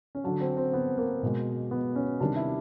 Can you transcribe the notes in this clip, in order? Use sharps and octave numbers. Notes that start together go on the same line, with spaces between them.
C#4
D3 F#3 D4
C4
C4
B3
A#3
B2 G#3
B3
C#4
C3 D#3 G3 D4
E4